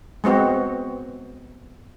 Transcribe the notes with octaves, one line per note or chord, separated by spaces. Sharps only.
G#3 B3 C4 F#4